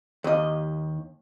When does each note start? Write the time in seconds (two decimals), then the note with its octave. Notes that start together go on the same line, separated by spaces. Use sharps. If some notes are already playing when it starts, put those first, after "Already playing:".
0.24 D#2 D#5